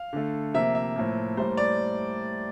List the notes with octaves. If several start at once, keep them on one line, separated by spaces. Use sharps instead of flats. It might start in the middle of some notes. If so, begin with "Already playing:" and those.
Already playing: F5
D3 A3
C3 F3 A#3 E5
E5
A2 F3 A#3
A2 G3 A#3 C5
D5